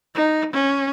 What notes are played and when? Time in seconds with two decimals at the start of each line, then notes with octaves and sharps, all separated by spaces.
0.15 D#4
0.53 C#4